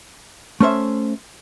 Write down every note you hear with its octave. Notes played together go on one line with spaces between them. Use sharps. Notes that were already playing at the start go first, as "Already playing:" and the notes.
A3 C#4 C5 E5